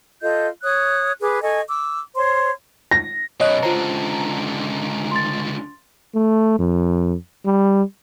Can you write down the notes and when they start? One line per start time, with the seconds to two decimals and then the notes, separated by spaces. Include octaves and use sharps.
0.21 F4 A4 D#5 G6
0.62 C#5 D#6 F#6
1.21 G#4 B4 D6
1.42 A4 D#5 G#5 C#6
1.68 D6 E6
2.15 C5 C#5 C6
2.91 A#6
3.40 F#2 B2 C#5 D#5 F#6
3.63 C#2 D3 F4 C5 A#5
5.11 C6 A6
6.15 A3
6.59 F2
7.45 G3